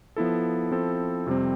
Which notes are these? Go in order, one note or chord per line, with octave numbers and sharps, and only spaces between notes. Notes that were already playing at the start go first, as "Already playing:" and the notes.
F3 B3 E4 A4
F3 C4 E4 A4
F2 C3 G3 C4